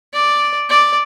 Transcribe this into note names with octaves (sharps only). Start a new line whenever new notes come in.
D5
D5